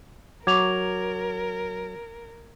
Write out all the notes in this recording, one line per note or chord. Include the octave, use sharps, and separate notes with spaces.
F#3 A#4 C#6 D6 G#6 F7